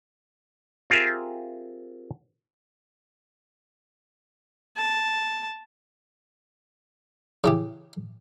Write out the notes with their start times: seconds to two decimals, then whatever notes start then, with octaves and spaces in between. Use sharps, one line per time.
0.90 C4 F4 G4 G#4 A#4 E5
4.77 A5
7.44 C#3 E3 G4